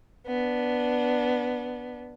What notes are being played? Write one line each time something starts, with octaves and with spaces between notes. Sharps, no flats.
B3 D4